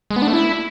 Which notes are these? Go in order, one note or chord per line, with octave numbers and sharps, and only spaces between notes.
G#3
B3
D4
A3
E4